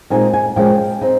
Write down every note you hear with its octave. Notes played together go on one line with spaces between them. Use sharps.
A#2 G#3 C4 D#4 G#5
G#5
A#2 F3 G#3 C#4 G5
C4 D#4